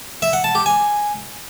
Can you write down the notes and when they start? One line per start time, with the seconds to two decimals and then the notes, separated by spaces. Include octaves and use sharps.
0.22 E5
0.33 F#5
0.44 A5
0.55 G4
0.66 G#5